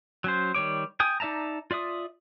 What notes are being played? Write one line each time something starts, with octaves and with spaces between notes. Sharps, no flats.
F#3 C#4 C5
D#3 G3 C#5 D6
G5 G#5 D#6
D#4 D5 E5 A5 A#5
F4 D5 E5 D#6